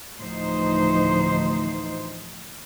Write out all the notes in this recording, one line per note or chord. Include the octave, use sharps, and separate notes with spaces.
D2 A2 E3 F3 D#4 C5